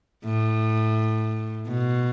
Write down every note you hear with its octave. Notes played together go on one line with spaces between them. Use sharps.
A2
B2